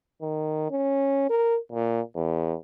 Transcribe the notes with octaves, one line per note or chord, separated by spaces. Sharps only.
D#3
C#4
A#4
A#2
E2